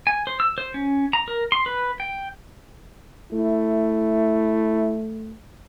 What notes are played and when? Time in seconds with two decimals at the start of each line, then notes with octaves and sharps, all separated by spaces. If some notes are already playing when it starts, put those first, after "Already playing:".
0.07 G#5
0.27 C5
0.40 E6
0.58 C5
0.74 C#4
1.13 A#5
1.28 A#4
1.52 C6
1.66 B4
2.00 G5
3.32 A3 E4